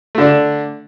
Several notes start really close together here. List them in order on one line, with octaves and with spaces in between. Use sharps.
A3 D3 D4